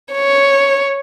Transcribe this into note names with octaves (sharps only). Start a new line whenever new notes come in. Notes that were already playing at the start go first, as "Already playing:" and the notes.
C#5